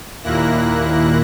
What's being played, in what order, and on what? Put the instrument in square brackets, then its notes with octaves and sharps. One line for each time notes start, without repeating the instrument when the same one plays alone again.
[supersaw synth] D#2 A#2 A#3 E4 F#6 A#6